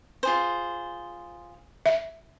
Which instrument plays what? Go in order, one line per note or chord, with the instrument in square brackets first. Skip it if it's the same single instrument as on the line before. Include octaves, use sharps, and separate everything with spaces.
[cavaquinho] F4 G#4 C5
[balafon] E5